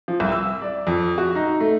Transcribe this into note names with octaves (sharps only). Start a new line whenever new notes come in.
F3
C2
E6
D5
F2
F#4
D#4
A3